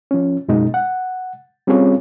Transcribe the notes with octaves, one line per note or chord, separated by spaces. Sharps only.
F3 C#4
F#2 B2 G#3 D#4
F#5
G3 C4 C#4 F4 G#4 C#5